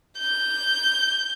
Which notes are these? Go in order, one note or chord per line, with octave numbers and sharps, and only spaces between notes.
G6